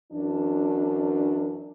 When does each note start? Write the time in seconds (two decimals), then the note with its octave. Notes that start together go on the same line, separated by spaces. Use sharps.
0.12 F#2 E3 D4